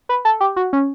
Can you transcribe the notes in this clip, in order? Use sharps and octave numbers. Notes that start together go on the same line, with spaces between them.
B4
A4
G4
F#4
C#4